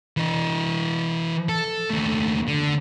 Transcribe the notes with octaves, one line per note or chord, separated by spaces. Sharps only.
E3 D#5
A4
D#2 A3
D3